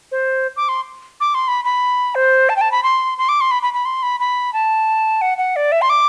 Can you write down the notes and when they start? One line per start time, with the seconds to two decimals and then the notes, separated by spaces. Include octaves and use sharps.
0.12 C5
0.57 D6
0.69 C6
1.20 D6
1.34 C6
1.48 B5
1.65 B5
2.15 C5
2.49 A5
2.56 G5
2.61 A5
2.71 B5
2.83 C6
3.18 C6
3.29 D6
3.41 C6
3.51 B5
3.62 B5
3.74 B5
3.85 C6
4.03 B5
4.20 B5
4.53 A5
5.21 F#5
5.38 F#5
5.56 D5
5.72 E5
5.82 C6
5.90 D6